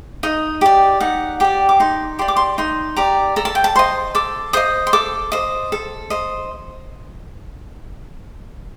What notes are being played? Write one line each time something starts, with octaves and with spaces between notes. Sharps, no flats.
D#4 D#5
G4 D5
D#4 F#5
G4 D5 G5
D6
D#4 C6
G4 D5 C6
D6
C6
D#4 C6
G4 D5 A#5
A4 A#5
A5
G5
A5
C5 D#5 C6
A4 D6
C5 D#5 D#6
C6
A4 D6
C5 D#5
A4
C5 D#5